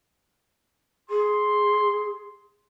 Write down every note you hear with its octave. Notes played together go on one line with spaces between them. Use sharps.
G#4 C6